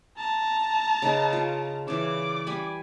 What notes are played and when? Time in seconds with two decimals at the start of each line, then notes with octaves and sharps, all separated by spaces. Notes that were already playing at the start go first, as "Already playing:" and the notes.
0.18 A5 A#5
1.02 C#3 D#4 B4
1.33 F4
1.88 C#3 E3 D5 D6
2.47 G3 G#5 B5